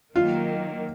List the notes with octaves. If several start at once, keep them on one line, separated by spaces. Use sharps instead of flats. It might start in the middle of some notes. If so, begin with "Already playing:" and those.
D#3 F#3 A#3 F4